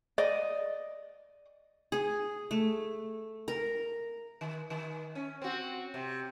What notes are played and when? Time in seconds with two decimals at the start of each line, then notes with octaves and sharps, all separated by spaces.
0.18 D5 D#5
1.92 G#4
2.51 A3
3.48 A#4
4.41 D#3
4.70 D#3
5.15 C#4
5.42 C4 F#4
5.94 C3